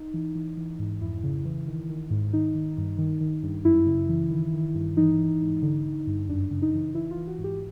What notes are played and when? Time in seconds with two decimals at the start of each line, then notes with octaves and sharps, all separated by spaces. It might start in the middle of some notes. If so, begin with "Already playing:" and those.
Already playing: D#4
0.14 E3
0.35 E3
0.57 E3
0.79 G#2
1.01 F2 E4
1.23 C#3
1.45 E3
1.67 D#3
1.89 D#3
2.10 G#2
2.33 D#3 D#4
2.55 D#3
2.78 G2
2.98 D#3
3.21 D#3
3.43 G2
3.65 F#2 E4
3.87 C#3
4.09 E3
4.30 D#3
4.53 D#3
4.75 G2
4.97 E3 D#4
5.19 E3
5.41 G#2
5.62 D3
5.85 D3
6.07 G2
6.29 F#2 D4
6.51 C#3
6.62 D#4
6.73 E3
6.95 E3 E4
7.11 F4
7.17 E3
7.28 F#4
7.39 G#2
7.44 G4